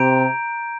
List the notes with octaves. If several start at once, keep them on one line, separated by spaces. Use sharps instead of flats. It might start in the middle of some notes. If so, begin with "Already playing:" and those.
Already playing: C3 A#5 G6 D7